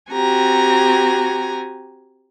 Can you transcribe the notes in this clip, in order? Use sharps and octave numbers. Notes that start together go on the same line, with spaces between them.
C4 F#4 G4 G#5 A#5